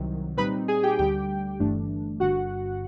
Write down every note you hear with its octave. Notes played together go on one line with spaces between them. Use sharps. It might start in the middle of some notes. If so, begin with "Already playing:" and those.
Already playing: C2 C3 D#3 F#3
A#2 G3 C4 D#4 B4 B5
G#4 G#5
G4 G5
D2 D3 G3 G4 G5
G1 G2 E3 A3 D4
G1 G2 D3 F#4 F#5